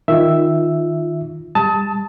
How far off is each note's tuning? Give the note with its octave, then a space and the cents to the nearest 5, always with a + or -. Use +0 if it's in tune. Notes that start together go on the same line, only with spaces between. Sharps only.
D#3 +0 F4 +0 E5 +0
G3 +35 A5 +0 D#6 +35